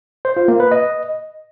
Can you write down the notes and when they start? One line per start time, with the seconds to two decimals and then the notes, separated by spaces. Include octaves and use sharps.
0.25 C5
0.37 F4
0.48 A#3
0.60 B4
0.72 D#5